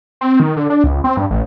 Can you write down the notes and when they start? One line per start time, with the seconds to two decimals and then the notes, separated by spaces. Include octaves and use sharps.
0.21 C4
0.40 D#3
0.57 D3
0.70 D4
0.84 C#2
1.04 C4
1.17 G2
1.31 A1